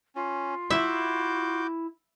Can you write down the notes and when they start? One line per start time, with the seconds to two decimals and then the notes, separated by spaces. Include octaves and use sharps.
0.16 C#4 F4
0.70 E4 F#4 E5 D6 G6